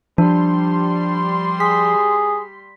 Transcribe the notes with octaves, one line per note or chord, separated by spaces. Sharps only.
F3 G3 D4 C6
G#4 B6